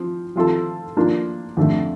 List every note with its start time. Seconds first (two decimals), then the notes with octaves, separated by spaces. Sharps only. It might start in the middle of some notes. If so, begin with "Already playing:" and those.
Already playing: F3 C4
0.36 F3 C4 F4 A4
0.97 F3 A#3 D4 F4
1.57 F2 D3 A3